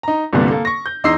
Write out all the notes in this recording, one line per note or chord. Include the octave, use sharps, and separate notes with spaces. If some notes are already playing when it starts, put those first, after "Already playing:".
D#4 A#5
C2 G2 A#2 D3 G3 B3
A#3 A4
C#6 A#6
G6
E2 D#4 C6 E6 C7